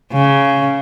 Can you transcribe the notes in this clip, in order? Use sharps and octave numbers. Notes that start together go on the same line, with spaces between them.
C#3